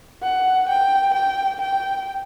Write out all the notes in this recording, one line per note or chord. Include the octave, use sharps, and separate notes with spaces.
F#5
G5
G5
G5